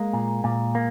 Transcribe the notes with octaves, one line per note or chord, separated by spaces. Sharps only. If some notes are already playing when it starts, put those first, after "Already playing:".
Already playing: G#3 A#3
A#2
A#2
A#3